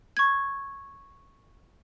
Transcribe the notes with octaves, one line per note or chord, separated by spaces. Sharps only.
C#6 G#6